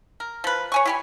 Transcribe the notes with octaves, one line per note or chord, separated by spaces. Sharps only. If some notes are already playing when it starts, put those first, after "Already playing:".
A#4
F3 B4
C#5 G#5 C#6
E4 G4 G#5